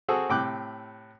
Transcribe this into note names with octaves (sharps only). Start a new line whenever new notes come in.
C4 F#4 G#4 A4
A2 C3 G5 D6 F#6